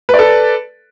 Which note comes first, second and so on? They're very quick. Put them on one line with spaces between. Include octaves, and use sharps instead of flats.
B4 D5 A4